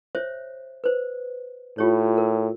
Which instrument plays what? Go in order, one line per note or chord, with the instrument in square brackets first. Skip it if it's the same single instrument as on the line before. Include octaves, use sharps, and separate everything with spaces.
[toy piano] C5 C#5 E5
B4 C5
[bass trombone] A2 [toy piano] F4 G4 C#5
[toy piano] A#4